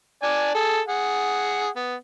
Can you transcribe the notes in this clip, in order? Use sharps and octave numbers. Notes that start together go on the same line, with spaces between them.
D4 D5 G#5
G#4 A4
G#4 F#5
B3